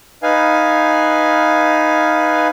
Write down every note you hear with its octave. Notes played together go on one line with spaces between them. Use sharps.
D#4 B4 F5 G#5